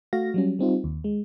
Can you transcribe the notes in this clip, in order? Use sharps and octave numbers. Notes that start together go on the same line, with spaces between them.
A3 F#4 F5 A#6
F#3 G3 C#4
G3 C4 D#4 F4
D#2
G#3